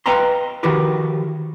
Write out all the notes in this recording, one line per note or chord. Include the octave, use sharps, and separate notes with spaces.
B4 D#5 F5 G5 A#5 C6
D#3 F3 F#4 G4 A#4 B4